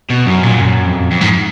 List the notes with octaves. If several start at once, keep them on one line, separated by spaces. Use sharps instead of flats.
B2
F#2
A#2
F#2
F2
F2
G#2